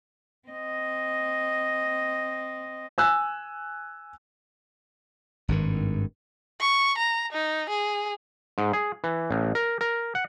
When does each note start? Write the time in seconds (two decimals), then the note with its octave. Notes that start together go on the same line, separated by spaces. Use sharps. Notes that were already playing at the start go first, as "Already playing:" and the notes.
0.48 C4 D#5
2.98 G#5 E6 F#6
5.48 G#1 G2 D#3
6.60 C#6
6.98 A#5
7.32 D#4
7.70 G#4
8.58 G#2
8.73 G#4
9.04 E3
9.31 A1
9.55 A#4
9.81 A#4
10.15 F#5